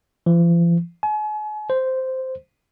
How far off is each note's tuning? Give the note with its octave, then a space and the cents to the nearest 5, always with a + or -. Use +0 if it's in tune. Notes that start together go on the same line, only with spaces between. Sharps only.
F3 -45
G#5 +40
C5 -5